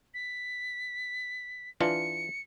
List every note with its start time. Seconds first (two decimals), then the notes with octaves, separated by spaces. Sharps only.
0.14 B6
1.81 E3 D4 F4 C#7